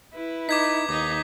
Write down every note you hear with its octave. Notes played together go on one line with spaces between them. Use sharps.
E4 B4
D#4 D6 G#6 B6
D#2 D#4 D6